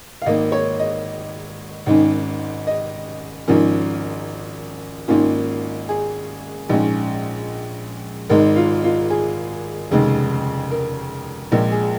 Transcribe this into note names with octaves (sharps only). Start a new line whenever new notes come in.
F5
G#1 G#2 D#3 A#3 D#5
C#5
D#5
G#1 G#2 D#3 C#4
D#5
G#1 G#2 F3 C#4 A#4
G#1 G#2 D#3 A#3 C#4 F4
G#4
A#1 G#2 G#3 C#4
G#1 G#2 G#3 A#4
F4
F4
G#4
F1 D#2 C#3 G#3
A#4
A#1 A#2 G#3 A#4
G#4